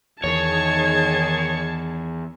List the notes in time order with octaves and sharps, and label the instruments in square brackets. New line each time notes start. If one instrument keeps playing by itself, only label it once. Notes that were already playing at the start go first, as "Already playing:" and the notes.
[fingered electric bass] E2 [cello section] D#3 G#4 [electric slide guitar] C#5 [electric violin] A5 G#6